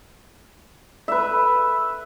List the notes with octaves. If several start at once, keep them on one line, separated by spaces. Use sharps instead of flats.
B4 E5